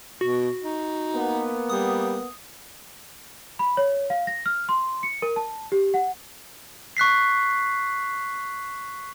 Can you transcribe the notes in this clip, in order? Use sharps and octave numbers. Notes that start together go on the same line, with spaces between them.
B2 F#4
D#4
A#3 B3
G3 D#6
B5
C#5
F5
A#6
F6
C6
C#7
A#4
A5
G4
F#5
C#6 F#6 B6 C7